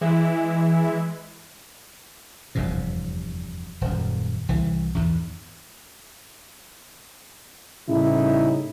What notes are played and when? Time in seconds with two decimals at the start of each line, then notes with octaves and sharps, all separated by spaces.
0.01 E3 G#3 E4
2.55 F1 E2 G2 C3
3.81 D#1 F#2
4.49 C2 E3
4.95 E2 G#2
7.88 A2 C#3 G3 C#4 D#4 E4